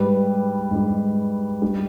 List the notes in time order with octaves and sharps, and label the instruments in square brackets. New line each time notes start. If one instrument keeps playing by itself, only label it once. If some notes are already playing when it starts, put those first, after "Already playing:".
Already playing: [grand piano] G#2 G3 B4
G#2 G3
G3